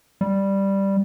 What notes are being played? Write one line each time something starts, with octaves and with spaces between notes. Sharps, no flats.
G3